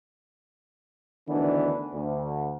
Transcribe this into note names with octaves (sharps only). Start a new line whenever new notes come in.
D2 D#3 E3 B3 D4
D2